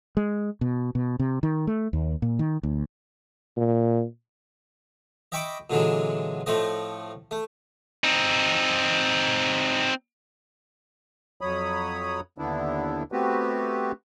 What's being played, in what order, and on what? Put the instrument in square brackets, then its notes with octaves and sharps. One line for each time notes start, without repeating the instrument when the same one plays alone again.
[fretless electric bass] G#3
B2
B2
C3
D#3
A3
D#2
A#2
D#3
D2
[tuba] A#2
[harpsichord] D#5 E5 G5 B5 C#6 D6
A#2 D3 E3 F#3 G#3
A2 F3 A3 C4 D#5
A3
[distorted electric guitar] C4 D#4
[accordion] F2 F#3 C#5 B5 D#6
D#2 D3 B3 D4 E4
A3 B3 C4 F#4 G4 B4